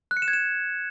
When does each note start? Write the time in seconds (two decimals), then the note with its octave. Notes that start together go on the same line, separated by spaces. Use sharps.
0.11 F#6
0.17 C#7
0.22 E7
0.28 G#6
0.33 E7